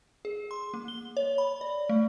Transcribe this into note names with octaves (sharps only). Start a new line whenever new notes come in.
G#4
C6
A#3
G7
C#5
B5
D5
A3